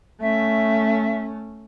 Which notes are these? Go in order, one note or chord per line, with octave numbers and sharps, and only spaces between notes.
A3 C#4 E5